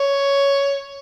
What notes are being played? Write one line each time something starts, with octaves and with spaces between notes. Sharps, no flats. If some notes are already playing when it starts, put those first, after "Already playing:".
Already playing: C#5